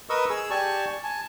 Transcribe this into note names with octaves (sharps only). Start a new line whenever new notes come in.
A#4 B4 D#5 C#6 D#6 E6
G#4 E6
G4 D5 G#5 A5 C#6
G#5 A5